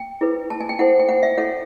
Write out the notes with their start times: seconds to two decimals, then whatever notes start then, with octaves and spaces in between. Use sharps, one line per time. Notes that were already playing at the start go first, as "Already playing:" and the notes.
Already playing: G5
0.21 E4 G#4 B4
0.50 A5
0.60 G#5
0.69 G5
0.79 E4 A4 C5 F#5
0.99 G5
1.09 F#5
1.23 E5
1.37 E4 A4 C#5 F#5